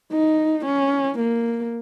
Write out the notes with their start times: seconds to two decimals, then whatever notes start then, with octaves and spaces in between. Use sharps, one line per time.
0.13 D#4
0.65 C#4
1.18 A#3